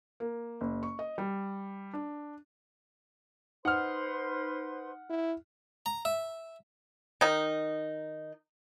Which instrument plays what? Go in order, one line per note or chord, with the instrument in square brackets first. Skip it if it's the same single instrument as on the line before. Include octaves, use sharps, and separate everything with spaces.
[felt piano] A#3
F#1
C#6
D#5
G3
D4
[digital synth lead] D#4 [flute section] B4 C5 C6 [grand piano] F#5 F6
[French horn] E4
[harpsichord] A#5
E5
[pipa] D#3 D#4